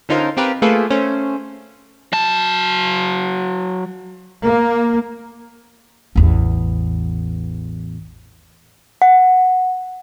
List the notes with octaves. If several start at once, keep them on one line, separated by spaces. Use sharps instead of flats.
D3 C#4 D#4 F4 A#4 C5
C4 F4 G4 A#4 B4
A3 A#3 F4 G#4 A4 B4
A3 C#4 C5
F#3 A5
A#3
A1 E2
F#5